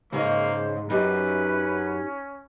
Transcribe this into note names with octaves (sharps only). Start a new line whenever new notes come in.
G#2 C#3 A#3 C5 C#5 D#5
F#2 C#4 D#4 G4 B4